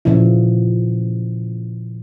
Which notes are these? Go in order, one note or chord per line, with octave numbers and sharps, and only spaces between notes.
A#2 C#3 F3 E4